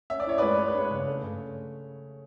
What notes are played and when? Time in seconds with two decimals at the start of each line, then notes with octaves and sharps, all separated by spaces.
0.10 C#4 E5
0.20 D5
0.27 E4 C#5
0.38 G#3 B4 D5
0.58 G#3 C#5
0.68 B4
0.75 D4 C#5
0.91 C#3
1.07 A3
1.23 C#3